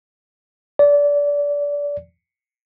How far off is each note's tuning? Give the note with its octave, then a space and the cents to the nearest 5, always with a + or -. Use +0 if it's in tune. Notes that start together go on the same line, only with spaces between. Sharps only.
D5 -25